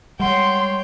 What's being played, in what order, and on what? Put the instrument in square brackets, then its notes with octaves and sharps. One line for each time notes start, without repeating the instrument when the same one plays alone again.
[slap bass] G3 G#3 [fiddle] C#5 G5 [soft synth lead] F#5 [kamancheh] C6